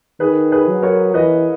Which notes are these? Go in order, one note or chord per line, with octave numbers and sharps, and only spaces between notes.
D#3 G#4 B4
G#4 B4
F#3
A#4 C#5
E3 B4 D#5